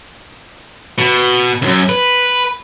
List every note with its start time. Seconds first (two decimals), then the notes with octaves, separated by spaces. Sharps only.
0.98 B2
1.62 C#2 F#2
1.89 B4